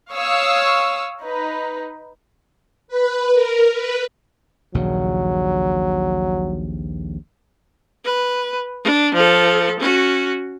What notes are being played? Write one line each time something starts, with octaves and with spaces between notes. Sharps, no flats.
C#5 F5 C#6 D#6 E6
D#4 B4
B4
A#4
B4
A#1 D#2 C#3 F#3
B4
D4
F3 A4
C#4 F#4